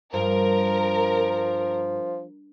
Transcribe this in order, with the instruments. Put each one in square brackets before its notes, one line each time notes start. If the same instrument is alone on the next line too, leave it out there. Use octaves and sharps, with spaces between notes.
[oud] G2 [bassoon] F3 [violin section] A#4